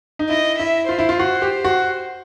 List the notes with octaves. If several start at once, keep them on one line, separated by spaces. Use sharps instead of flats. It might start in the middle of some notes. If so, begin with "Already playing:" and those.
D#4
E4 D#5
E4 E5
F4 C5
E4
F4
F#4
G4
F#4